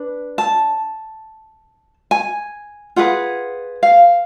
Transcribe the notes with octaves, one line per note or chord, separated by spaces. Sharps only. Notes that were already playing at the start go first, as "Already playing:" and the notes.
Already playing: D4 B4
A5
G#5
F4 G#4 B4 F#5
F5